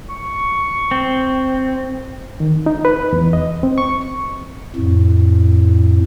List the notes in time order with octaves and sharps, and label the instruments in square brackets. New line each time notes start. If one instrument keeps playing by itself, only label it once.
[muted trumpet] C#6
[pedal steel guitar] C4
[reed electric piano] D#3
D#4
B4
E2
D#5
C4
C#6
[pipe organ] F2 A2